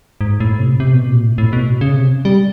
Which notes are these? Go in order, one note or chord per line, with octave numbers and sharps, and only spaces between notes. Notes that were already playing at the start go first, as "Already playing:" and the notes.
G#2
A2
C3
C3
B2
A#2
A2
A2
B2
C#3
C3
G3